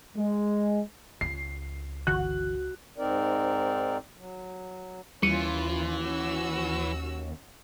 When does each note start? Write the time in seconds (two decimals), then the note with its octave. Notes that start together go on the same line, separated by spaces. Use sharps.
0.15 G#3
1.21 C#2 C7
2.07 G1 D3 E3 F#4 F#6
2.98 G#2 C4 D#4 A#4 D5
4.17 F#3
5.23 D#2 E3 G3 C#4 F4 C#7 D#7
6.01 C#4 F#4 E6